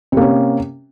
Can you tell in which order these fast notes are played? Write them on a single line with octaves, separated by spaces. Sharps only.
C3 A#3 C#4